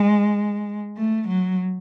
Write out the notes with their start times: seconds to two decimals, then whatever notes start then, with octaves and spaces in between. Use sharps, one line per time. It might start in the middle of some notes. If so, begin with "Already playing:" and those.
Already playing: G#3
0.96 A3
1.28 F#3